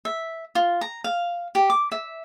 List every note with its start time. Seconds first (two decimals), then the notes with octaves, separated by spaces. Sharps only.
0.05 E5
0.55 F4
0.81 A#5
1.04 F5
1.55 G4
1.70 D6
1.92 E5